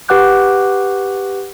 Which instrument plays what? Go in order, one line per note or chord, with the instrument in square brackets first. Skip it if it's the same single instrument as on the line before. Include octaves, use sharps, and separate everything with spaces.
[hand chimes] G4 B4 F#5 D6 F#6 G6